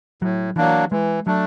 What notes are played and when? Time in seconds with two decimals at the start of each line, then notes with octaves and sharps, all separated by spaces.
0.22 A2 F#3
0.56 E3 F#3 A#3 D4
0.92 E3 G#3
1.27 F#3 A3 D4